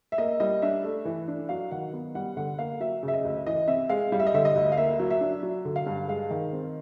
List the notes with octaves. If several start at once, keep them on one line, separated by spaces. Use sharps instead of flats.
E5
A#3 D#5
G3 D#5
D4 E5
A3
E3
D4
F#3 F5
D#3 F#5
B3
G3 F#5
D3 F#5
A#3 F5
F#3 E5
C#3
E5
D#5
D2
E3 D#5
C3 E5
G#3 F5
G3 F5
E5
D#5
D3 E5
D#5
D2
F5
A#3 E5
F#3
E5
D4
F#3
D3
F5
G2
G#3 F5
D#3
C4